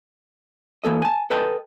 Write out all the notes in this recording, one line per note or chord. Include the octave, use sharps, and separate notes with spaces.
E3 A#3 A4 D#5
G#5 A5
A4 B4 D#5 G5 A5